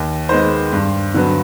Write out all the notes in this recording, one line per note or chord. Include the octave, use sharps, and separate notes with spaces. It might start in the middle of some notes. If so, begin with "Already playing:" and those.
Already playing: D#2
D#3 G#3 B3 C5
G2
D3 F#3 B3